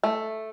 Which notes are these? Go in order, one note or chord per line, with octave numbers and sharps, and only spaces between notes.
A3